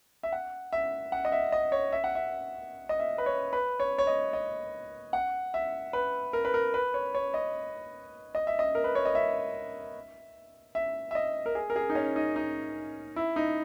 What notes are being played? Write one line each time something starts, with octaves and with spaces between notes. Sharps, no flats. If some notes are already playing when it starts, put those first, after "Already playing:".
E5
F#5
E5
F#5
D#5
E5
D#5
C#5
E5
F#5
E5
D#5
E5
B4
C#5
B4
C#5
C#5
D#5
D#5
F#5
E5
B4
A#4
B4
A#4
B4
C#5
C#5
D#5
D#5
E5
D#5
A#4
B4
C#5
D#5
E5
E5
E5
D#5
A#4
G#4
A#4
G#4
D#4
C#4
D#4
D#4
E4
D#4